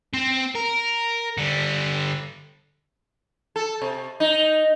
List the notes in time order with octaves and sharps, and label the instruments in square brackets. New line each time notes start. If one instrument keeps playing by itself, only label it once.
[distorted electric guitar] C4
A#4
D3 G3
[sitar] A4
C3
D#4